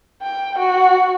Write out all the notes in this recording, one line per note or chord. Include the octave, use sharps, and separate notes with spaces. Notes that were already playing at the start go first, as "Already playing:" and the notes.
G5
F#4